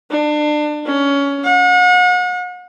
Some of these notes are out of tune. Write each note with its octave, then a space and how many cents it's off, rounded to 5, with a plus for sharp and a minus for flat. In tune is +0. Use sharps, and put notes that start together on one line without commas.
D4 +30
C#4 +20
F#5 -40